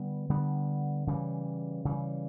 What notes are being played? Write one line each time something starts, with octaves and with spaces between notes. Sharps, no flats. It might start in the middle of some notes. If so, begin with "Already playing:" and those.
Already playing: D3 G3 B3
D3 G3 B3
C#3 E3 G3
C#3 E3 G3